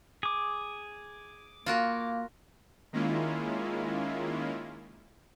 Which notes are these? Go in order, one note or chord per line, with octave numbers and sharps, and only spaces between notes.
G#4 D6
A#3 F4 F#4 A#4
D#3 G#3 A#3 C#4 E4 F4